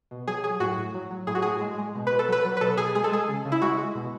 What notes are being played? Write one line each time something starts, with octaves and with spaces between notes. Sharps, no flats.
B2
F#3 G#4
F#3 G#4
A2 F#4
A2
F#3
F#3
A2 G#4
F#4
A2 G#4
G#3
G#3
B2
B2 B4
A4
F#3 B4
F#3
B4
B2 A4
B2 G#4
G#3 G#4
A4
G#3 G#4
C#3
C#3
E4
G#3 F#4
G#3
B2